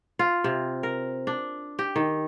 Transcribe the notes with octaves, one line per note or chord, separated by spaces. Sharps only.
F4
C3
A#4
D4
G4
D#3